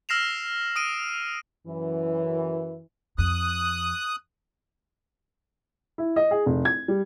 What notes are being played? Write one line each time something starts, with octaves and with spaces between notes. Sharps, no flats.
E6 F6 A#6 C7 E7 F7
D#6 D7 D#7
F#2 E3
F2 D#6 F#6
E4
D#5
G#4
F1
G#6
G3